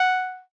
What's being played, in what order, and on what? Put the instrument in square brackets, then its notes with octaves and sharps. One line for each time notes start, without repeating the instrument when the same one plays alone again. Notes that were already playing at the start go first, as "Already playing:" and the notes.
Already playing: [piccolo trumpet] F#5